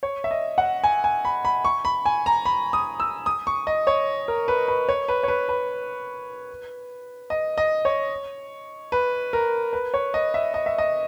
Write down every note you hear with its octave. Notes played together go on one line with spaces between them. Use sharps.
C#5
E5
D#5
F#5
G#5
G#5
B5
B5
C#6
B5
G#5
A#5
B5
D#6
E6
D#6
C#6
D#5
C#5
A#4
B4
B4
C#5
B4
C#5
B4
B4
D#5
D#5
C#5
B4
A#4
B4
C#5
D#5
E5
D#5
E5
D#5